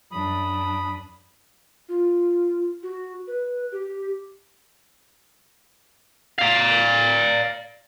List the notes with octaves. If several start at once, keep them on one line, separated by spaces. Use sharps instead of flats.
F#2 D4 B5 D#6
F4
F#4
B4
G4
D5 F5